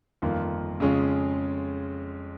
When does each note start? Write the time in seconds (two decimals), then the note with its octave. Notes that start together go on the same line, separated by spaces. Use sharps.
0.22 G1 F2 D#3 A#3 F4
0.80 F2 C#3 G#3 C#4 F4